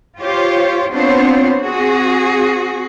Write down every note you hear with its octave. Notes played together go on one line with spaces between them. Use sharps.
F4 G4 C5 C#5
B3 C4 D4 F4 C5 C#5
C4 F#4 G#4